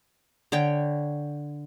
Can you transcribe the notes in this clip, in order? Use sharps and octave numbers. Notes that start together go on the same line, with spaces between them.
D3 C#5 G5